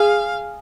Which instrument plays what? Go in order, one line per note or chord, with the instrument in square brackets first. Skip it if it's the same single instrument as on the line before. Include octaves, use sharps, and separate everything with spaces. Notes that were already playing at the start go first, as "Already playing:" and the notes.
Already playing: [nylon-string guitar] G#4 [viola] F5